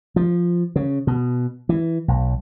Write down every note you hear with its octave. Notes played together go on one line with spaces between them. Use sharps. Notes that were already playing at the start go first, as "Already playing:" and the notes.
F3
C#3
B2
E3
B1